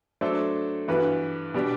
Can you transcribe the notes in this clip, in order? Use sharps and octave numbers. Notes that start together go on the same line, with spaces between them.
F#3 A3 D4 A4 C5
G2 E3 B3 F#4 B4
B2 G3 D4